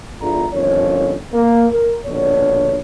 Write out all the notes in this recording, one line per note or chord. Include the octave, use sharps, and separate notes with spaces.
G1 E2 D3 E4 F4 A#5
G1 F2 D#3 F3 C#4 C#5
A#3
A#4
A#1 B2 D3 D4 C#5